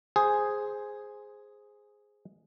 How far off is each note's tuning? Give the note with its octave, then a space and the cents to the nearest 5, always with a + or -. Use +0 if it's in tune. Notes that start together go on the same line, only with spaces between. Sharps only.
G#4 +0 C5 +0